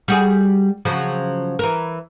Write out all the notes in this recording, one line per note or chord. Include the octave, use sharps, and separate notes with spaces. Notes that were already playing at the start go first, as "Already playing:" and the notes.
G3 F#4 G#4
C#3 F3 F#3
E3 A#4